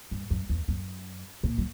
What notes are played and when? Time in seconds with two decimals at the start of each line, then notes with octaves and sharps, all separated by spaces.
0.11 G2
0.30 F#2
0.49 E2
0.68 F#2
1.43 A#2
1.58 F#3